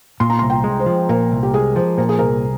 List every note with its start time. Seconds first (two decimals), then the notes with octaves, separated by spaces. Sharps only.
0.20 A#2 C6
0.30 A#5
0.39 C2 C6
0.50 G5
0.64 G#3
0.80 C5
0.86 F3
1.09 A#2 A#4
1.32 C2
1.43 G4
1.54 G#3 G#4
1.76 F3 C5
1.98 A#2 A#4
2.09 G#4
2.19 C2 A#4